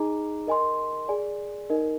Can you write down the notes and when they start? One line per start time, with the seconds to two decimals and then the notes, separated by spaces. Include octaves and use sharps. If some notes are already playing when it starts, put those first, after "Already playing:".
Already playing: D#4 G#4 D#5 A#5 D6
0.47 A#4 D#5 G#5 C6
1.08 G#4 D5 G#5
1.70 D#4 A#4 D#5